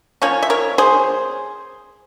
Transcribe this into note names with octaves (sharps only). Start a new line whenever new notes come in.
F3 A#3 C#4 C#5
E5
A#4 C#5
G#4 C5